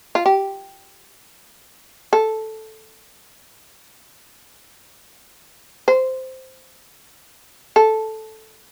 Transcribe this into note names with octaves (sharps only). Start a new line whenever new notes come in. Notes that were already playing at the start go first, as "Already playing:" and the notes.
F4
G4
A4
C5
A4